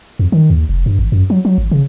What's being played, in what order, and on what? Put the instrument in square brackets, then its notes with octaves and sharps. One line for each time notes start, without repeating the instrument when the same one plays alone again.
[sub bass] F2
D#3
D#2
F1
G2
G#1
F#2
F#3
F#3
G#1
C#3